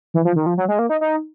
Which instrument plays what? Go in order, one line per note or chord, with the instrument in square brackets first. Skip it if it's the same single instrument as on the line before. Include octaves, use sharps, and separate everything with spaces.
[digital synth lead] E3
F3
D#3
F3
F#3
G#3
A#3
D#4
D#4